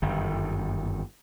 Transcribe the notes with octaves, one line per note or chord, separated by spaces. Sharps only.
G1 F#2 D#3